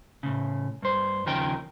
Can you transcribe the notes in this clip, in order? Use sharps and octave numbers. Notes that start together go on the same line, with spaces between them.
A2 C#3
G2 C5
D#2 C#3 F3 D#4 A#4 G5